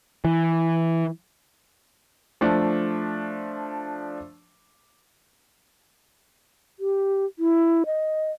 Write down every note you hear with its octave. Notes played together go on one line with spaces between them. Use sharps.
E3
F3 A3 D4
G4
E4
D#5